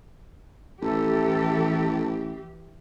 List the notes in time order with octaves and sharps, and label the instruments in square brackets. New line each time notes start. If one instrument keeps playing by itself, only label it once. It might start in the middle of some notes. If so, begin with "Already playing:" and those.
[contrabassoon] A1 [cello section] E3 G4 [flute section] A4